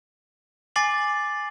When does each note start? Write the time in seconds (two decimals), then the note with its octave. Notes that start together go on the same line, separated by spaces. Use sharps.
0.76 G#5 D6 A6 C7 F#7